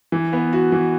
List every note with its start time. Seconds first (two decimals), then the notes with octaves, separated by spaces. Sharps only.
0.12 E3
0.33 B3
0.53 F#4
0.72 E3